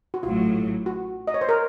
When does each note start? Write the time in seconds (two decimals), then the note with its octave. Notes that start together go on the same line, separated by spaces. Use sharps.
0.14 F#4
0.23 A1 A2 F#3 F4
0.86 F#4
1.27 D#5
1.34 C#5
1.41 C5
1.49 A#4